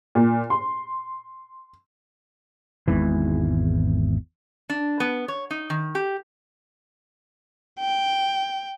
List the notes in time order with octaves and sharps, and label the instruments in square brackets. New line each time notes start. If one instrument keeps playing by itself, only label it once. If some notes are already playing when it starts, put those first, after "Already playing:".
[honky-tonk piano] A#2
C6
[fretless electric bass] G#1 E2 G#2 E3
[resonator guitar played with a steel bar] D4
B3
C#5
D#4
D#3
G4
[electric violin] G5